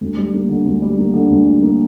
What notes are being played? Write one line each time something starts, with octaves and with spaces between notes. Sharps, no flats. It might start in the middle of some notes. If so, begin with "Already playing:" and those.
D2
G3
A#3
D3
D2
G3
A#3
D3
D2
G3
A#3